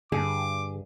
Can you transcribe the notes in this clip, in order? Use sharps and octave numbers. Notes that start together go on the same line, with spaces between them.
G2 D3 G#4 D6